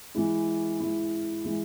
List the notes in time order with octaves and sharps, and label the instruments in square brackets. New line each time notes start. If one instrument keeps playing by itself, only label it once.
[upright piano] E3 G#3 E4
E3 G#3 E4
E3 G#3 E4